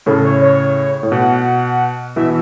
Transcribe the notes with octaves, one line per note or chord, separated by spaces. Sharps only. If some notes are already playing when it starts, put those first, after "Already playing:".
A2 C#3 A4
C#5
C#5
A2
B2 F#5
B2 E3 E5